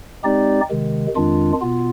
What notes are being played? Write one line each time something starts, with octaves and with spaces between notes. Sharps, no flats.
G#3 C4 D#4 G4 D5
C3 D#3 G#3
F2 D#3 G#3 D4 F4
B2 B3 F4